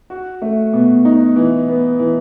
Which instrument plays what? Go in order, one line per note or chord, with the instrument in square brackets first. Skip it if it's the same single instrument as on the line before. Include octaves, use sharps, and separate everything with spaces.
[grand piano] F#4
A3
B2
D#4
E3
B3
E3